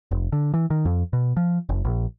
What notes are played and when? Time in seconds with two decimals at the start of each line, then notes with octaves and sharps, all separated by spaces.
0.11 F1
0.32 D3
0.54 E3
0.70 D#3
0.85 F2
1.13 B2
1.37 F3
1.69 F#1
1.85 A#1